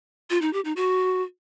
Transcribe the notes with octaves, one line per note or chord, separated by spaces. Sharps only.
F4
D#4
G4
D#4
F#4